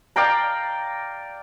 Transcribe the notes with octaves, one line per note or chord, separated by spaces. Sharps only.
D5 F5 G5 A#5